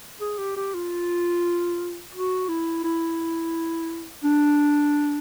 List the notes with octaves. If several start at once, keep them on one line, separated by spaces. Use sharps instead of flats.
G#4
G4
G4
F4
F#4
E4
E4
D4